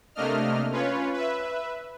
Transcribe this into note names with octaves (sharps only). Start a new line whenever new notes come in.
C3 A3 A#3 D4 D#5 F6
C#4 F4 B4 C#5
B4 E5